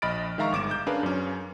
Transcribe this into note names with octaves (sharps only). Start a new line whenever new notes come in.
A#1 D#5 B5 F6 A6 D7
D#3 G#3 E5 F5 A#5 C#6
G1 D6 D7 E7
D6 G6
C#4 D4 G#4 A#4 B4 F5
F#2 C#4